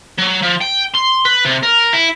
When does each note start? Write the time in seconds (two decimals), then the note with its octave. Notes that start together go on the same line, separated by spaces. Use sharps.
0.18 F#3
0.42 F3
0.61 G5
0.94 C6
1.25 B4
1.45 C3
1.63 A#4
1.93 E4